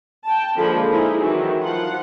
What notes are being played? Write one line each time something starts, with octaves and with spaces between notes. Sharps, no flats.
G5 A5
D3 F3 G#3 A#3 B5
D#4 E4 G#4
D#3 E3 F#3
F3 F4 F#5